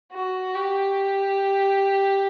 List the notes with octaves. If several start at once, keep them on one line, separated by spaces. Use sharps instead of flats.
F#4
G4